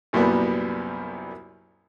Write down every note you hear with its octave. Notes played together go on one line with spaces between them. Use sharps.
C2 F#2 A#2 G3 B3